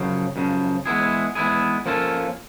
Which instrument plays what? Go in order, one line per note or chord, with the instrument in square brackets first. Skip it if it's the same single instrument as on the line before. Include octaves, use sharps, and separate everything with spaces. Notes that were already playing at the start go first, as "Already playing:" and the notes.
Already playing: [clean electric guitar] F#2 C#3 F3
F#2 C#3 F3
E3 G#3 B3 E4 G#4
E3 G#3 B3 E4 G#4
F3 A#3 C#4 F4 A4